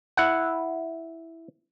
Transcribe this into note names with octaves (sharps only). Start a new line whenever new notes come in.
E4 F#5